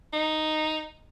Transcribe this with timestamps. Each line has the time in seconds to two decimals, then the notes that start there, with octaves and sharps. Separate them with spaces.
0.13 D#4